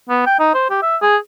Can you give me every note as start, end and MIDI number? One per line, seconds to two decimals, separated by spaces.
0.09 0.22 59
0.26 0.37 79
0.39 0.52 63
0.54 0.67 72
0.70 0.78 67
0.82 0.97 76
1.02 1.17 68